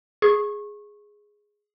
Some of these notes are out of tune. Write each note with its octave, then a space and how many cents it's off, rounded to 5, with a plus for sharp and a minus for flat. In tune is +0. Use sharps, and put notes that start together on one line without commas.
G#4 +0 C#6 -25